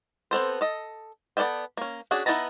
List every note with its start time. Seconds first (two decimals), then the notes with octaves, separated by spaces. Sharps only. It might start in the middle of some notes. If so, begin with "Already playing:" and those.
0.31 B3 C4 A4 C5
0.61 A4 D#5
1.37 B3 A4 D5 E5 G5
1.77 A#3 C#4
2.11 C#4 D4 F#4 G#4
2.26 B3 D#4 E4 A5 A#5